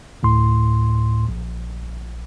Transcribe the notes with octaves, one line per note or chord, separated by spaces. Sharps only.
D2 A2 C6
A#1